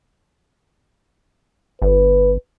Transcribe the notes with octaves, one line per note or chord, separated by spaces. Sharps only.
G1 B4